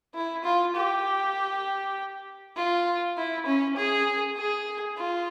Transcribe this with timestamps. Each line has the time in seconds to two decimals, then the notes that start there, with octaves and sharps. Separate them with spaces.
0.15 E4
0.44 F4
0.75 G4
2.56 F4
3.17 E4
3.46 C#4
3.76 G#4
4.37 G#4
4.97 F4